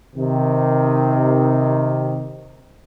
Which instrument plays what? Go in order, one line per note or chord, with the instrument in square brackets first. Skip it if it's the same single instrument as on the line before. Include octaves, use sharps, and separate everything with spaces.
[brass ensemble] C3 D#3